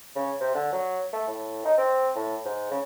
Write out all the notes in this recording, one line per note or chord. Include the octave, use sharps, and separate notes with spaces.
C#3
C3
D3
F#3
A3
A2
D#4
C4
A2
G#2
C#3